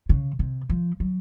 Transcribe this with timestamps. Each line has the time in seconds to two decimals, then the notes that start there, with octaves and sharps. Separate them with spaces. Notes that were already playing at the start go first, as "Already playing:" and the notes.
0.09 C#3
0.39 C3
0.69 F3
1.00 F#3